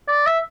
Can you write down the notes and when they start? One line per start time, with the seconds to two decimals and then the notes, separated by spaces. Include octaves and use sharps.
0.08 D5
0.26 E5